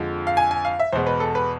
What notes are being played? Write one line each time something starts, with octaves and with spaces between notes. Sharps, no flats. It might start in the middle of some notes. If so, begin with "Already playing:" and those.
Already playing: F2 D3 F3 G#3
F5
G#5
G#5
F5
E5
E2 B2 G#3 C5
B4
A4
B4